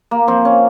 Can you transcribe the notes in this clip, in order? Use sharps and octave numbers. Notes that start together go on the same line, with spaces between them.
A#3
F3 C4
C#4